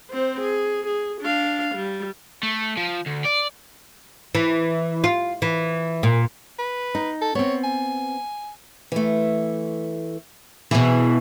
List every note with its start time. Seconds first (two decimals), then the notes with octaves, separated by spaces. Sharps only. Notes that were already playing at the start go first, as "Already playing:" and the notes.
0.11 C4 C5
0.41 G#4
0.87 G#4
1.22 D4 F5
1.75 G3
2.43 A3
2.77 F3
3.07 D2
3.25 D5
4.35 E3
5.04 F4
5.42 E3
6.03 A#2
6.59 B4
6.95 D#4
7.21 A4
7.35 B3 C4 C#5
7.63 G#5
8.92 E3 A3
10.71 B2 E3 G#4